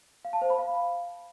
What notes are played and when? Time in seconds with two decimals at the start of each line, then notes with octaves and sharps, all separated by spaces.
0.25 F5
0.33 A5
0.42 C5
0.50 B5
0.59 F5